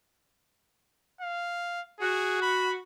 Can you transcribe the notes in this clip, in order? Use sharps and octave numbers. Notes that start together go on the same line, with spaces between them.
F5
F#4 G#4
B5